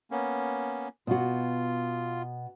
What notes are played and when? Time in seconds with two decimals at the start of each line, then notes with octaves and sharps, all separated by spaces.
0.11 A#3 B3 C#4
1.07 B2 F4 F#4